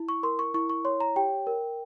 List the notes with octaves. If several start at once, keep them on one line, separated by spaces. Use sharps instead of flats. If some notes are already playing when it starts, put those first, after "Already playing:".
Already playing: E4
C#6
A#4 C6
C#6
E4 C#6
C#6
C#5 C6
A#5
G4 G5
A#4